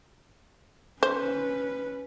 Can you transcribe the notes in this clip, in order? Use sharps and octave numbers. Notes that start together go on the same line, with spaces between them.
C#4 B4 C5